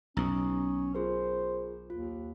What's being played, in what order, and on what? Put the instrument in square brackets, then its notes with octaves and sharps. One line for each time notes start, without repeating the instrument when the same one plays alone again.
[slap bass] B1 B2 [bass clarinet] C#4 [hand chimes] A#5 D#6
[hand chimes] F4 G#4 A#4 [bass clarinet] C5
[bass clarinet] D#2 [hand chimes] F4